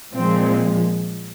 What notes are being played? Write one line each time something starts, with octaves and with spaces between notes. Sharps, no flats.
A#2 F3 G#3 C4